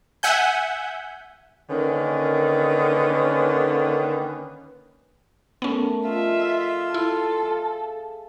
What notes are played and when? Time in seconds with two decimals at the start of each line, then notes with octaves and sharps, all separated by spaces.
0.23 E5 F#5 G#5 G6
1.70 D3 D#3 A#3 C#4 B4
5.62 A3 B3 C#4 A#4 F#5
6.05 F3 F4 G#4 D#5 E5
6.94 E4 A4
7.43 G#4 E5 F5